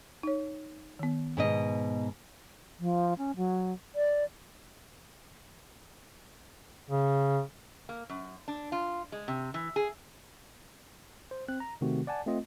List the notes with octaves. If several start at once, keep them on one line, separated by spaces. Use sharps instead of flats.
D#4 C#5
D#3 B3
G#2 B2 D#5
F3
C#4
F#3
D5
C#3
A#3
F#2
D4
F4
G#3
C3
E3
G#4
C5
C4 F#6
A#5
C3 D#3 A3 C4 F#4
D5 F#5 G#5 A5
A3 C4 F4 D#5